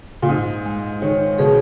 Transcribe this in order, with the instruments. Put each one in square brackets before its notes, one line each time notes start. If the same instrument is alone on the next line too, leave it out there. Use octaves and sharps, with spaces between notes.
[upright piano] A#2
[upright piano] G#2 [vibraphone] D#4
[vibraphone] G#3
[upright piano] D#3 [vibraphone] C#5
[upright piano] B2 [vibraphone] G#4